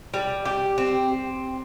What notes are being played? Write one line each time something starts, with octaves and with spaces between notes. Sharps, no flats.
G3
G4
C4